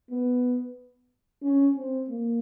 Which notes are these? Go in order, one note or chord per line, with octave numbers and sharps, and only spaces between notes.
B3
C#4
C4
A#3